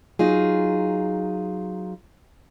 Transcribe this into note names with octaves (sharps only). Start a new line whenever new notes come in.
F#3 D#4 F4 G#4